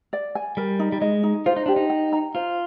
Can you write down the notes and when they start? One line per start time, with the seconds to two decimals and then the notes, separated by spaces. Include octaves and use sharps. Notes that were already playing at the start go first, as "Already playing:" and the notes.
0.13 D5
0.35 G#5
0.57 G3 A#4
0.79 D#4
0.92 G3
1.01 G#3 D#5
1.23 D#4
1.46 F4 C5
1.56 D#4
1.66 D4 G4
1.76 D#4
1.90 G5
2.13 A#5
2.35 F4 C5